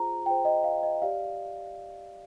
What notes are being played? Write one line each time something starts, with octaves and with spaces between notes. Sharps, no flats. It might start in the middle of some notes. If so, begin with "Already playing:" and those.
Already playing: F4 G#4 C5 A#5
F4 G#4 C5 G5
D#5
F5
D#5
G4 D5 F5